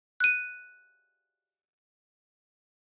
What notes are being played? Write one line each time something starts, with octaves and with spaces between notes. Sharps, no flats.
F#6 D#7